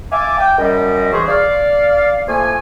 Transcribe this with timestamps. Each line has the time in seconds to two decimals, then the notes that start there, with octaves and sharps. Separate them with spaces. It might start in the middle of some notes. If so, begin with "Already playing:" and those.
0.11 E5 F5 G#5 A5 D6
0.39 G5
0.58 F#2 G3 D#5
1.12 G#2 C#3 E3 G#4 C5 C#6
1.28 D5 F5
2.27 F3 A3 A#3 G#5